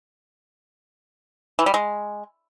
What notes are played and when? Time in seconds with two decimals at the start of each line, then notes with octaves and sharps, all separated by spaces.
1.59 E3
1.66 G3
1.74 G#3